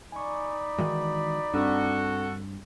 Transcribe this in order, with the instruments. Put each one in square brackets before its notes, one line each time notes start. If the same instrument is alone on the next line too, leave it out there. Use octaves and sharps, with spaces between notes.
[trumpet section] D#4 D5 B5 [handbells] G#5 C#6
[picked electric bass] D#3 E3 G#3 [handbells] F#4
[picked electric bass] G2 [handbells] C4 D4 [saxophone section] F#4 A4